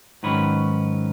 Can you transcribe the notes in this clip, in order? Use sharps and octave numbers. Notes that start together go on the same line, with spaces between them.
G#2 D#3 F#3 C#4 B4